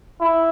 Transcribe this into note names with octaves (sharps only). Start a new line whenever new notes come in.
E4